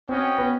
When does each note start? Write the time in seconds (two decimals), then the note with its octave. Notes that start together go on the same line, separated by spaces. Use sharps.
0.08 C4 C#4 F#4 B4 D#5 G5
0.38 B3